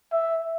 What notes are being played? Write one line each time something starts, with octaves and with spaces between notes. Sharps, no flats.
E5